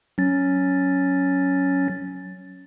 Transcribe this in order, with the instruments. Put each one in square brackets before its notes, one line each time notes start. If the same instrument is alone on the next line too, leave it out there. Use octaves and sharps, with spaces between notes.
[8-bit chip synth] F#3 C#4 A6